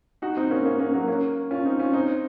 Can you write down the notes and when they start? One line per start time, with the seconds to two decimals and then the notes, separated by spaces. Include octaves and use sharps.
0.22 D#4 F#4
0.37 C4 D#4
0.51 A#3 C#4
0.65 A#3 C#4
0.79 A#3 C#4
0.93 F#3 A#3
1.08 A#3 C#4
1.51 C#4 F4
1.65 C4 D#4
1.79 C#4 F4
1.93 C4 D#4